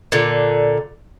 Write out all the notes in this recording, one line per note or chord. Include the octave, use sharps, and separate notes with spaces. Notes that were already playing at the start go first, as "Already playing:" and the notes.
A#2 D3